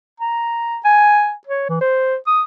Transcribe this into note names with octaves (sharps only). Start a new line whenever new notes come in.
A#5
G#5
C#5
E3
C5
D#6